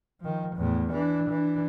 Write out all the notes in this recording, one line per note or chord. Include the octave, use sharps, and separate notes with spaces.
D#3 F3
E2 A2
E3 D4
E3 D4